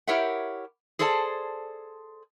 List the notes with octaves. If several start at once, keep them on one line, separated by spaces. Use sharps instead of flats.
E4 G4 A#4 C#5 E5 F#5
G#4 A4 C5 D5 F#5 A5